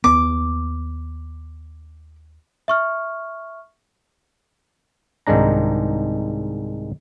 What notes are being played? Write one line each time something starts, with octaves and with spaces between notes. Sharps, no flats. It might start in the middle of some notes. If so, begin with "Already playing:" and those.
D#2 B3 D6
E5 C#6 F6
C2 G#2 D#3 G#3 D4 A#5